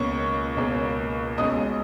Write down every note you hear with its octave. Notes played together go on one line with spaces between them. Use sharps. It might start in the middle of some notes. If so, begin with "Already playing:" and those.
Already playing: C#2 B2 A#3 C#4 C#5 C#6
C#2 B2 A#3 C#4
B1 B2 G#3 C#4 D#5 D#6